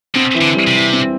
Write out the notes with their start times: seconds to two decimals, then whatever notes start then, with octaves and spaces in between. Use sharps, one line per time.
0.15 B2 C4
0.34 E3
0.41 D3
0.54 G3
0.67 C3
0.74 E3
0.93 C4